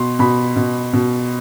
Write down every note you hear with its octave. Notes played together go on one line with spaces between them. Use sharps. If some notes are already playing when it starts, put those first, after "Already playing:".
Already playing: B2 C6
B2 B5
B2
B2